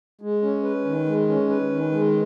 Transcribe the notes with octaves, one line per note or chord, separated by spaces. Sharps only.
G#3
C#4
B4
D#3
G#3
C#4
B4
D#3
G#3